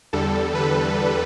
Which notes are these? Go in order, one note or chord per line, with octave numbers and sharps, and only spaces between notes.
E2 D3 G3 A4
B4